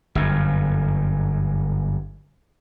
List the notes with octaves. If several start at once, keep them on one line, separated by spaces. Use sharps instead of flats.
G1 F#2